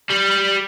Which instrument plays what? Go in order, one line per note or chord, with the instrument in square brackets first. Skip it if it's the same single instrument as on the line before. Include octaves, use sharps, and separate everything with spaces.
[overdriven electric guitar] G3